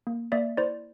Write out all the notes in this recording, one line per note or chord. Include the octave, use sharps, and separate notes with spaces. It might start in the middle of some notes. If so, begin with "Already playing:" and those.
A#3
A#3 D5 E5
E4 C5 D5